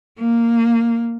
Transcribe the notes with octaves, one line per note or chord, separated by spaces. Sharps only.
A#3